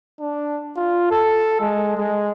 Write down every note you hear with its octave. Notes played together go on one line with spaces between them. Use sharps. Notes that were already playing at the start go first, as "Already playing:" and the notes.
D4
F4
A4
G#3
G#3